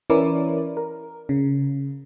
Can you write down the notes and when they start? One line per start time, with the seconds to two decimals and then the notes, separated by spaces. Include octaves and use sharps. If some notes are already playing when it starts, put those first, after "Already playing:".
0.10 E3 C#4 E4 A#4 D5
0.77 A#4
1.29 C#3